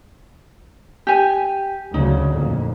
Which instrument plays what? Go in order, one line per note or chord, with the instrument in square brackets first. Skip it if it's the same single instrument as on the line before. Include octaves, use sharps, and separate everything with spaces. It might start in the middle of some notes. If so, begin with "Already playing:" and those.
[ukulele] G4 G#5
[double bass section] D2 C#3 F#3 [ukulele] D#4
[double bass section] F2 A#2